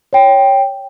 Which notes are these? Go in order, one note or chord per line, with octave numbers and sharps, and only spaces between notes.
C#5 G5